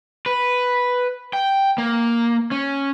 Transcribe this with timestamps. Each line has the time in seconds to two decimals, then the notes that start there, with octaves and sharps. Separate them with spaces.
0.26 B4
1.33 G5
1.78 A#3
2.51 C#4